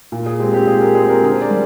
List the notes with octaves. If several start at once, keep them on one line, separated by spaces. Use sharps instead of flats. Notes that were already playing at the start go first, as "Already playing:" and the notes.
A#2
G#4
G#3 C4 G4
G4
A#2 G#4
G4 A#4
G#3 C4 G#4
G4 A#4
D3 G#4 C5
A#4 D5
G3